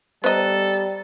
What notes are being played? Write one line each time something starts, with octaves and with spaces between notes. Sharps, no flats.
G3 B3 A4 C5 D#5 A#5